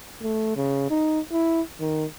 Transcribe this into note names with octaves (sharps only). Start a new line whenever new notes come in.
A3
C#3
D#4
E4
D#3